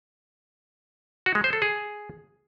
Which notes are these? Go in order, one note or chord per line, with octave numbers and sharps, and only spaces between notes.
F#4
G#3
C5
A4
G#4